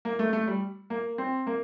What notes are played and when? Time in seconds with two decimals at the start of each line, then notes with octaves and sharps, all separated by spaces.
0.05 A#3
0.19 A3
0.33 A3
0.47 G3
0.90 A#3
1.18 C4
1.47 A#3